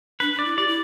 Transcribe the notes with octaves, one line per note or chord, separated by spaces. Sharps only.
D4 B4
D4
D5
E4
G4 D5
E4